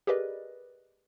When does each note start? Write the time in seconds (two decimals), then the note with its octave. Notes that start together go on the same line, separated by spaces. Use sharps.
0.07 G4 G#4 A#4 B4 D5 D#5